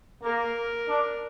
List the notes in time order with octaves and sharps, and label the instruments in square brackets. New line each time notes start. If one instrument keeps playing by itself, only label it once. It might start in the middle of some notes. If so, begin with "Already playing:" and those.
[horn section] A#3 [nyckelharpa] A#4
[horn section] D4